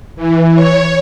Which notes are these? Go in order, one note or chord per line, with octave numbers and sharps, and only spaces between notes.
E3
C#5